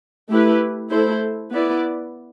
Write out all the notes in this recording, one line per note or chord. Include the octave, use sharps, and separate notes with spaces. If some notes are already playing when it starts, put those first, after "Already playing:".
A3 E4 G4 B4
A3 E4 A4 C5
B3 E4 B4 D5